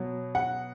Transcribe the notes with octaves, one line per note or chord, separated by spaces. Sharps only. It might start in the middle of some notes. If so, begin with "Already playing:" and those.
Already playing: B2 F#3
F#5